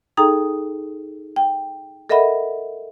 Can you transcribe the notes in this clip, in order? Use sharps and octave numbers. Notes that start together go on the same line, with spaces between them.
D#4 G#4 A4 G5 A#5 D#6
G5
A4 A#4 D#5 E5 F#5 B5